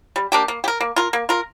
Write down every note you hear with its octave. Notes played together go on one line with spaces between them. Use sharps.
G3
A#3 D4 G4
A#3
G4
A#4
A#3
F4 A#4
A#3
F4 A#4